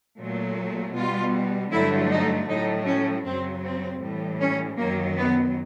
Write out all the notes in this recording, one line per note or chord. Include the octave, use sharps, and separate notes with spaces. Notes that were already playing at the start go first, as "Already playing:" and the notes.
A#2 F#3 A3
B2 G3 F4
G2 D3 F#3 A3 E4
D#4
A2 F#3 A3 D#4
C#4
F#2 C#3 F#3 C4
C4
A2 E3 G3
C#4
F#2 D#3 F#3 A#3
B3